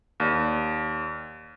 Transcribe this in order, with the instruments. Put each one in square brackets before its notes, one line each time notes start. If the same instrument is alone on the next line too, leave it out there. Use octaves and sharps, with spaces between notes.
[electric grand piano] D#2 D5